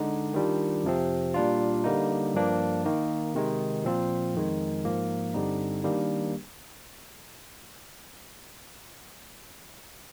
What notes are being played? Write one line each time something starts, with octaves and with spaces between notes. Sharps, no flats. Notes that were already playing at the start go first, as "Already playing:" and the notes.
Already playing: D3 G#3 D#4
D#3 G3 D4 F4
F2 C3 F3 C4
A#2 G3 D4 F4
D3 G3 A#3 D#4
G2 F3 A#3 D4
D#3 A#3 D#4
C3 D#3 G#3 D#4
A#2 F3 C4 F4
F2 D#3 G#3
G#2 F3 A#3
G2 D3 G3 C4 D#4
D#3 G3 A#3 D4